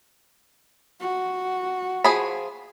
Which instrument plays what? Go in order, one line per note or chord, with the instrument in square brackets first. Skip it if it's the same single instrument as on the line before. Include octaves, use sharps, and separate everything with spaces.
[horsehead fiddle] F#4
[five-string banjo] F3 G#4 B5